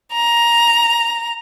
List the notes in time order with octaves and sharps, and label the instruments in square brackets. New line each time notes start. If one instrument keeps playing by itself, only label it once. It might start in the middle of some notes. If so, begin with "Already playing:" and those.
[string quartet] A#5